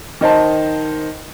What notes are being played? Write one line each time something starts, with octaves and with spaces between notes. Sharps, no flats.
D#3 D#4 C5 A5